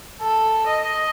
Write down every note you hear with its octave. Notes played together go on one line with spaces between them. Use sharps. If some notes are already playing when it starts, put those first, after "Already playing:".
A4
D#5